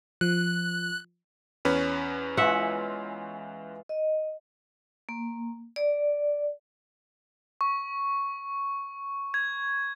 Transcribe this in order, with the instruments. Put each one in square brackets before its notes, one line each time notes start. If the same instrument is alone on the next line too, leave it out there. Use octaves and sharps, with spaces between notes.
[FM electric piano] F3 [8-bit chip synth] F#6
[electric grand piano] E2 C#4 B4
[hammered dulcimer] E3 G#3 F4 [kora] E5 F#5
[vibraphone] D#5
A#3
D5
[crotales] C#6
G#6